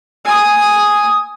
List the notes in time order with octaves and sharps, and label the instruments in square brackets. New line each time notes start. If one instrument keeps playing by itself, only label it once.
[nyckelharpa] G#5 D#6